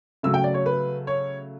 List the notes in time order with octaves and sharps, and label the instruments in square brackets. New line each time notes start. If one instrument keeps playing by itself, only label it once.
[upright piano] C#3 F#3 A3 E6
G5
D5
C#5
B4
C#5